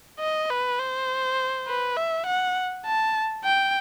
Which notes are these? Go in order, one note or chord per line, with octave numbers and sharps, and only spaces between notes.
D#5
B4
C5
B4
E5
F#5
A5
G5